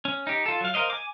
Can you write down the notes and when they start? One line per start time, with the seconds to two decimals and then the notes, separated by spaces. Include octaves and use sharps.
0.05 C#4
0.27 D#4 G4
0.46 F4 A4
0.61 F#3 F5
0.74 A#4 C5 D#5 F5
0.90 G#5 D6